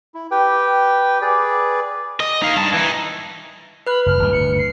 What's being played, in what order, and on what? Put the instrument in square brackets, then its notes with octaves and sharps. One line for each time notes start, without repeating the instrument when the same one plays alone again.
[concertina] E4
G4 B4 G5
G#4 B4 D5
[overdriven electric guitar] D#5
D#4 F5
G2 A5
E3 D#4
[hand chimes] B4 F#6 [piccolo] B5
[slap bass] F#1 [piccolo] F6
[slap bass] D1 G2
[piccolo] C#7
C7